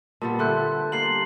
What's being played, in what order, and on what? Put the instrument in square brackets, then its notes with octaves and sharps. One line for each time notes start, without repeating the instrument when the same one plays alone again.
[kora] A#2 G3 B3 [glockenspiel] A5
[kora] D3 A3 [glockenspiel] C6 F#6 G6
[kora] G3 A#3 [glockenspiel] C6 C7 F#7